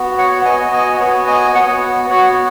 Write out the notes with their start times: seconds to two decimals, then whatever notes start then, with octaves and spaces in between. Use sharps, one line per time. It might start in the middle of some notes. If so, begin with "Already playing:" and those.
Already playing: B3 F#4
0.18 C#5 F#5
0.36 F#5
0.45 B3 F#4 D#5 G#5
0.73 D#5 G#5
1.00 B3 F#4 C#5 F#5
1.27 D#5 G#5
1.55 B3 F#4 C#5 F#5
2.09 B3 F#4 C#5 F#5